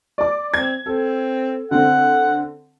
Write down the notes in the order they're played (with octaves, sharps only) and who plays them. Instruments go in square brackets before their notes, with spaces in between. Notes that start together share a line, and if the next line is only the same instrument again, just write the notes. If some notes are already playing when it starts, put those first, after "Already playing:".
[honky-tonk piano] D5 D6
[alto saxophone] C4 [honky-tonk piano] G#6
[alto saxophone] C4 [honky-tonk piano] A4
[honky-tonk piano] D3 C4 [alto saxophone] F#5